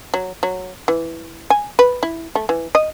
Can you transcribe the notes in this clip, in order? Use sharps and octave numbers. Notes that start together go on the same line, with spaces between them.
F#3
F#3
E3
G#5
B4
E4
A3
E3
D#5